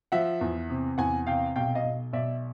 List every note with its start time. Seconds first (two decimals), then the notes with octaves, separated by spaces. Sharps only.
0.12 F3 E5 F#5
0.41 E2
0.70 C3
0.98 E2 F#5 G#5
1.27 C3 F5 G5
1.56 B1 F5 G5
1.75 D#5 F5
1.84 B1
2.13 B1 D5 E5